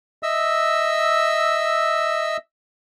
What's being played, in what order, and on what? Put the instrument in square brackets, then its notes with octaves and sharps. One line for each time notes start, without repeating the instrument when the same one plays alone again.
[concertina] D#5 E5 E6